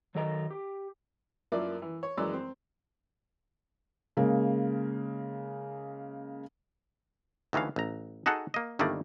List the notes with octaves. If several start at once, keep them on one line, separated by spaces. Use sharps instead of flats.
F#2 D#3 F#3 A4 D#5 A#5
G4
F#2 F3 A#3 E4 D5
E3
C#5
F#2 E3 G#3 D5 E6
C4
C#3 G#3 A#3
D2 D#3 E3 C#4 F5
A1 A#5
D#4 F#4 G#4 A4 F#5
A#3 D#5
G1 D#3 G3 A3 A#3 D5